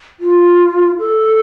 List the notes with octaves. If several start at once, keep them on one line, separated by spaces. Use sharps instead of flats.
F4
A4